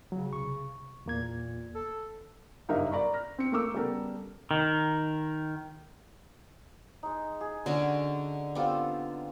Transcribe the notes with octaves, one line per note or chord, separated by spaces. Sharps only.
C#3 F#3
C2 C#6
E2 A#2 A#3 G#6
A4
F#1 G2 D#4 A#4 E5 F5
A#4 D5 A#5 B5 C#6
F6 A#6
C4 C#7
A3 A#3 A#4 C#6 D6 E6
C#3 G3 B3 G4 A4 A#4
D#3
G#3 D#4
G#4
D3 C#4 F#4
B3 C4 F4 G4 A4